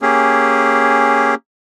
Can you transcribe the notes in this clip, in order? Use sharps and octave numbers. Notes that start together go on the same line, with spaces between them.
A#3 C#4 G4 G#4